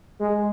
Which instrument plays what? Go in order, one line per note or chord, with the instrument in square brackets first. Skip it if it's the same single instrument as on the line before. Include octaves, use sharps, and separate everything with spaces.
[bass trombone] G#3